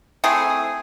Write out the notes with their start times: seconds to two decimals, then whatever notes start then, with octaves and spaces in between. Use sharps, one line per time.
0.24 A3 C4 E4 G#4